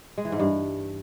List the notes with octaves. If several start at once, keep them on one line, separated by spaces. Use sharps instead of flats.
G#3
E3
G#2
G2